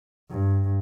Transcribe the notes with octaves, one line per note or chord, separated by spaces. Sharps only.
G2